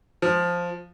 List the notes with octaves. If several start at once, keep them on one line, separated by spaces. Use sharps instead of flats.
F3